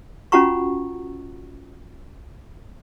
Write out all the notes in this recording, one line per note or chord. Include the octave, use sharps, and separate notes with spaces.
C#4 F4 F#4 F#5 A#5 C#6